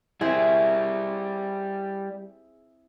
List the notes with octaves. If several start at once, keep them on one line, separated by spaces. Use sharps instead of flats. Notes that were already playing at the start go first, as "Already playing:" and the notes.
G3 C4 E4 G#4 E5